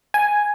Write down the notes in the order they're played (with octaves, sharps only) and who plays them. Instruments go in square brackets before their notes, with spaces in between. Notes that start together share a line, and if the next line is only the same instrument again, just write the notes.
[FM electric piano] G#5